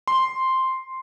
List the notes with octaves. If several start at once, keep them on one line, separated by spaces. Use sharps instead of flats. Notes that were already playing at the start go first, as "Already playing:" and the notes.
C6